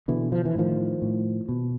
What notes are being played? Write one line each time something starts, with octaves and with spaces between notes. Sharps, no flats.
B2 D3 E3
F3
E3
A2 D#3 F3
A2
B2